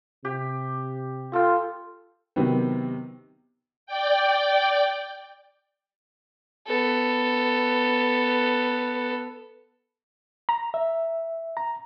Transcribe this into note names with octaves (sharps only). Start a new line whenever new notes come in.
C3 G4
F4 A4 G5
C3 D#3 F#3 B3 C4
D5 G5
B3 A4
A#5
E5
A#5